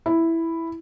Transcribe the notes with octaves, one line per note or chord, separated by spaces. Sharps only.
E4